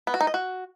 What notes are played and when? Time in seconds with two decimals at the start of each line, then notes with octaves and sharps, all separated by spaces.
0.07 B3
0.14 F#4
0.21 D#4
0.27 D#5
0.34 F#4